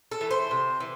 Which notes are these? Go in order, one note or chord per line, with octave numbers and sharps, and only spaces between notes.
A4
E3 A3
C5
C3
E3